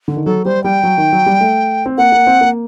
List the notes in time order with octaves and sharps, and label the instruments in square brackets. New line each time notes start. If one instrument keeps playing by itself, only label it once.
[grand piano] D3
D#3
[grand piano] F#3 [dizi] A4
[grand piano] G3 [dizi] C5
[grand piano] G3 [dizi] G5
[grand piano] F#3
D#3
F#3
G3
A3
C4
[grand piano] A#3 [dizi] F#5
[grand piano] A#3
C4
A#3